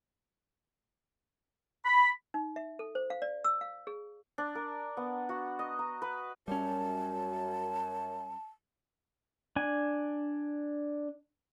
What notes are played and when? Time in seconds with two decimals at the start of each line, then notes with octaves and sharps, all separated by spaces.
1.85 B5
2.34 D#4
2.56 E5
2.79 A4
2.95 C5
3.10 F5
3.22 D5
3.44 E6
3.61 F5
3.87 G#4
4.38 D4
4.55 A#4
4.97 B3
5.29 F#4
5.59 D#5
5.79 A#5
6.02 B4
6.48 F#2 G3 C#4 A5
9.56 D4 G#5